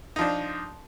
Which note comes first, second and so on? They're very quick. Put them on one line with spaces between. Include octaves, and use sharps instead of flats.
D#4 F3 D4